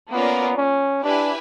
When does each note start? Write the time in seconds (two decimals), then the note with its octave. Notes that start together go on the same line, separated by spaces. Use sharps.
0.11 A#3 B3 C#4 F4 A#4 D5
0.57 C#4
1.03 D4 E4 G4 B4 E5 G#5